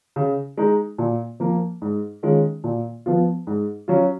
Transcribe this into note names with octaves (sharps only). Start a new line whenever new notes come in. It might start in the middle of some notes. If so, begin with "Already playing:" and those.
C#3
G#3 D#4
A#2
F3 A#3
G#2
D#3 G#3 C#4 F4
A#2
F3 B3 F4
G#2
F#3 C#4 F4